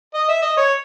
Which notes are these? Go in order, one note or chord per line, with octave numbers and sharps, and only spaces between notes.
D#5
E5
D#5
C#5